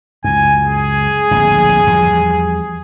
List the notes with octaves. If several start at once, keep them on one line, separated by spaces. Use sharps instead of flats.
C#2 F#2 G#5
G#4
D1 A#1 F2
E2 F3 G3